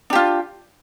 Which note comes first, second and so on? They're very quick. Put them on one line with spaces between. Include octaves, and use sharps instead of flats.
D4 G4 F4